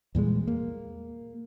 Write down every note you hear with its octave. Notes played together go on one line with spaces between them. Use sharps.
E2 A#2 G3 G#3
A#3